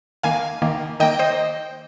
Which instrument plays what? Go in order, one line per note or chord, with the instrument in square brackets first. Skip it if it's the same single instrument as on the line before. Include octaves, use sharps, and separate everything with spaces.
[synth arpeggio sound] D#3 A#3 F5 G#5
D#3 A#3
D#3 A#3 D#5 G5
C5 D#5